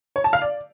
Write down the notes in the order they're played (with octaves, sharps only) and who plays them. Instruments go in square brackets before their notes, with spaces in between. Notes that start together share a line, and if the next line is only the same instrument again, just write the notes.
[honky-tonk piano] C#5
A5
F5
D5